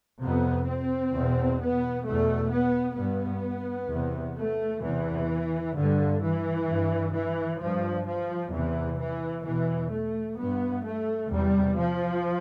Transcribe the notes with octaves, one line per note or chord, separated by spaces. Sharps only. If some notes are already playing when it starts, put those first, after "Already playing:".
F2 C3 B3
C4
E2 B2
B3
E2 B2 A3
B3
G2 B3
E2 C3
A3
E2 C3 E3
G2 D3
E3
G2
E3
G2 F3
F3
E2 C3 E3
E3
E2 B2 E3
A3
G2 B3
A3
E2 C3 G3
F3